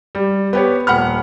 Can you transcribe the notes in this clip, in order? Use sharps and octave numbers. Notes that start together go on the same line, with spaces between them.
G3
B3 G4 C#5
D#1 F#5 B5 F6